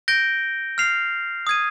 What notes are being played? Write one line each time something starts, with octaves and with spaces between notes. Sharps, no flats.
G6 A#6 D7 G7
F6 C7 F7
D#6 G#6 D#7